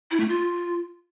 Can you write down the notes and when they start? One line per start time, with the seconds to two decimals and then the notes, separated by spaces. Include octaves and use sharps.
0.11 E4
0.20 A3
0.29 F4